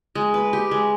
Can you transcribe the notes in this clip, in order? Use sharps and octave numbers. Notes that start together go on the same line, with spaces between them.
G#3
B4
G4
G#3